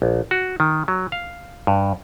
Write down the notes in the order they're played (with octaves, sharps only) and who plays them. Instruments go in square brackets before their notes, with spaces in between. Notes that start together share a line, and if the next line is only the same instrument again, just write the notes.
[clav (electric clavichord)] A#1
F#4
D#3
F#3
F5
G2